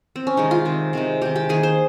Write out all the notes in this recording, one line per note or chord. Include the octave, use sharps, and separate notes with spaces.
C4
C#4
C3 D#3 G#3 D#4
F4
C3 D#3 G#3
C3 D#3 G#3
C3 D#3 G#3 G4
G4
D#3 A#3 G#4
C5